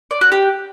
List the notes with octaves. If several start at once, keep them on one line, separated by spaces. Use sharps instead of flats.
D5
F#4
G4